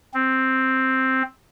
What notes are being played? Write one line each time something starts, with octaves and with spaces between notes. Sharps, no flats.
C4